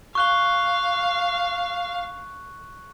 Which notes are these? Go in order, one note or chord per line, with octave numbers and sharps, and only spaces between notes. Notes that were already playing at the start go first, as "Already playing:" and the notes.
F5 C#6 F#6 G7